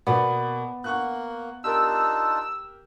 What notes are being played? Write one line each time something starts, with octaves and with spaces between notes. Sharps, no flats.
B2 A#3 B3 D5
A#3 F#5 C#6 F#6
D4 D#4 F4 G4 A#4 E6